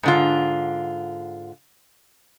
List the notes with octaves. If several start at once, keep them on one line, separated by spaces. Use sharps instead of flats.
G#2 D3 F4